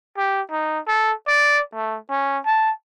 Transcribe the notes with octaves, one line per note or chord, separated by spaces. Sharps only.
G4
D#4
A4
D5
A3
C#4
A5